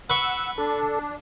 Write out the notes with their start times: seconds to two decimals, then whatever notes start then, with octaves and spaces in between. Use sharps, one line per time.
0.10 B4 F#5 C#6 E6
0.58 D4 A4